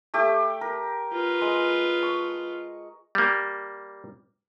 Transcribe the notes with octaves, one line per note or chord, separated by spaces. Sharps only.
A3 G4 D6
A#4
F4 B4
G#3
C#6
G3 A#3